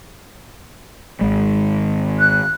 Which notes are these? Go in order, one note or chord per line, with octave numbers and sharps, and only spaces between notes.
G#1 G#3
F#6